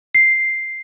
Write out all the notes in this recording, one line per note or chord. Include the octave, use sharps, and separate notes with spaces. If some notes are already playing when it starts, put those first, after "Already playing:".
C7